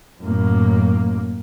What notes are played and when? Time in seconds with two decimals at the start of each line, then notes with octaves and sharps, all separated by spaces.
0.20 F#2 A2 A#3